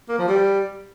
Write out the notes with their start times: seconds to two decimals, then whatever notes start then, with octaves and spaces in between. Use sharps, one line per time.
0.09 A#3
0.19 F3
0.28 G3